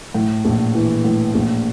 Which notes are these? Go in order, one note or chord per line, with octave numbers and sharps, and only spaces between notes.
A2
A#1
E3
A2
A#1